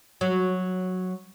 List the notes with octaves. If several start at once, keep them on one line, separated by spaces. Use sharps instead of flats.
F#3